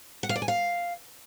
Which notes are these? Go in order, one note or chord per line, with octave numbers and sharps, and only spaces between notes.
F#5
F5
D5
G#5
F5